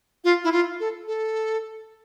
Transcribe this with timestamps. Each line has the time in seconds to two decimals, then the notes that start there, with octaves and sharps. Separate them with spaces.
0.24 F4
0.44 E4
0.52 F4
0.80 A4
1.07 A4